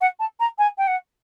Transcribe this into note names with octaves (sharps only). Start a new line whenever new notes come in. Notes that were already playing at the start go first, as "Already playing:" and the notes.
F#5
A5
A#5
G#5
G5
F#5